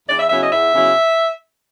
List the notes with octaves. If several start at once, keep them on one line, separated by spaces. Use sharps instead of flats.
E2 D5
E5
C#3 F#3 B3 E4 E5
D#5
E2 E5
C#3 F#3 B3 E4